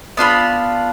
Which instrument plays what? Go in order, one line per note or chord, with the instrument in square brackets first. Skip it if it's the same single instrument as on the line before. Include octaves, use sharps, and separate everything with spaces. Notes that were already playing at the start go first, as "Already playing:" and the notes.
[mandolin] B3 D4 F4 B5